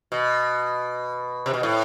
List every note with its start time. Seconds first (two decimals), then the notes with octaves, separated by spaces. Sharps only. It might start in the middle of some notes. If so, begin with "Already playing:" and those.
0.12 B2
1.46 C3
1.54 B2
1.63 A2